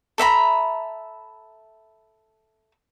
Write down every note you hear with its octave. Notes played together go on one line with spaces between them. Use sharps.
A4 E5 A#5 B5